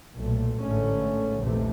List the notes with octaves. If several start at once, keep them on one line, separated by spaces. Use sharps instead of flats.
B1 A#2 A3
A1 G#2 D3 A3 C#4
A#1 D#2 C3 E3 A3